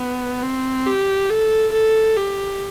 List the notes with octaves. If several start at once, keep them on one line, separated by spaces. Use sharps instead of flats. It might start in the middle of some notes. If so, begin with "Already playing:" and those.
Already playing: B3
C4
G4
A4
A4
G4